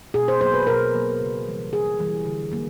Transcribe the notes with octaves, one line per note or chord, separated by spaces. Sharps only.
B2 G#4
C5
F#3 A#3 C5
B4
B2 A#4
F#3 A#3
C#3
E3 G3
C#3 G#4
E3 G3
D3
F#3 A#3